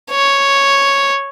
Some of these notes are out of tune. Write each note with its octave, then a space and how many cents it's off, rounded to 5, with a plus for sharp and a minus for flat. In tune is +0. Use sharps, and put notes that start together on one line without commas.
C#5 +0